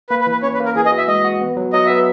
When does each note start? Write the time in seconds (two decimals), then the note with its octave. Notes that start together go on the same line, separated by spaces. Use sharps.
0.10 A#3 B4
0.21 B4
0.27 E3
0.32 B4
0.42 C#4 C#5
0.54 B4
0.60 A#3
0.65 A#4
0.76 E3 G#4
0.86 D#5
0.92 F#4
0.97 E5
1.08 G#3 D#5
1.24 F#4
1.41 B3
1.57 F#3
1.73 F#3 D#5
1.86 B3 E5